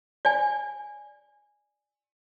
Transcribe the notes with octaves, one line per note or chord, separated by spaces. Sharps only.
D5 G#5